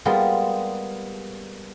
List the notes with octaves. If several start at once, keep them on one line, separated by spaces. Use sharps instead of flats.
G3 G#3 A#3 B3 F4 G#4